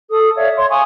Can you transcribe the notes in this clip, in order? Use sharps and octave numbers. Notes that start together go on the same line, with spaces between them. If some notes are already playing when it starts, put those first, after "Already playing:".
A4 D#6
C#5 D5 E5 F5
C#5 C6
F5 G#5 C#6 D#6